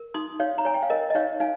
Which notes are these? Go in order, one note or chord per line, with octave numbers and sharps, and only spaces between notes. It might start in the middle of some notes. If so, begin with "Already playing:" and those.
Already playing: A#4
D#4 C6 D#6
D#4 C#5 F5
A#5
C#5 G#5
G5
F5
A#4 D#5
D#5
D#4 C#5 F5
D#4 F5 G#5